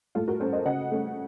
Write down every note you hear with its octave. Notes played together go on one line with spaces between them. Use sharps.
A2 F4 A4
F#4 A#4
A3 C#4 A4 C5
C5 D#5
C#3 D#5 F#5
A3 C#4